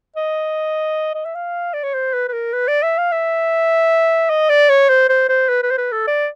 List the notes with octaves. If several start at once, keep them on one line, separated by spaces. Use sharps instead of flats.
D#5
D#5
E5
F5
D5
C#5
C5
B4
B4
A#4
B4
D5
E5
F5
E5
D#5
D5
C#5
C5
C5
C5
B4
B4
C5
B4
A4
D5